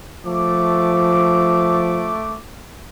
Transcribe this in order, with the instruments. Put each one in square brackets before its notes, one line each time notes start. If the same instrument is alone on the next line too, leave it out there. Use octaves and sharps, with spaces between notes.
[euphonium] F3 [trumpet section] A3 D6